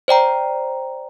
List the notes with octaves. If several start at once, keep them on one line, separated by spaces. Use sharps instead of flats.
C5 D5 G5 A#5